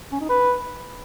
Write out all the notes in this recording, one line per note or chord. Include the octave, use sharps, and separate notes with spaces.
C#4
D#4
B4